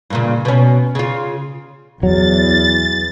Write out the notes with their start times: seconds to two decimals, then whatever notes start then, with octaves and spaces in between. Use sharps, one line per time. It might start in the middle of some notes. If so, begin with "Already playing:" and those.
0.10 G2 A#2 C#3
0.45 B2 C#4
0.95 C#3 F4
2.03 E2 F#3 A6